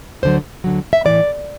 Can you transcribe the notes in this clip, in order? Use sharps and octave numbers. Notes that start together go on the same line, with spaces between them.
D2 D3 F#3 C5
D2 D3 F#3
E5
A2 E3 D5